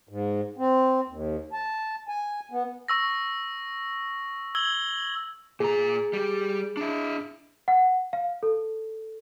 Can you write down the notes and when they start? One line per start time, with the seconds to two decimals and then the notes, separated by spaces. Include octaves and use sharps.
0.09 G#2
0.58 C4
1.07 D#2
1.53 A5
2.09 G#5
2.52 B3
2.88 C#6 E6 A#6
4.55 E6 G#6 F#7 G7
5.60 A#2 G#4 A#5
6.13 G3 G4
6.77 D4 E4
7.68 F#5
8.13 F5
8.43 A4